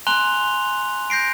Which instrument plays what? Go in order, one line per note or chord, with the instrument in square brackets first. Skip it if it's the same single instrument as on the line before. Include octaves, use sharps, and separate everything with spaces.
[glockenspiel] G#5 A#5 C6 F#6 F7 G7
G6 A#6 C7 D7